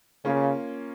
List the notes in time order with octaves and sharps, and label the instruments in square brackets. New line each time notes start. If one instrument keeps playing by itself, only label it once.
[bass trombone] C#3 [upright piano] A#3 C#4 F4